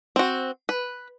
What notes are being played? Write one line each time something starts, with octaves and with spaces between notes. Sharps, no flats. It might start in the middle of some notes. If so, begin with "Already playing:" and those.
C4 F#4
B4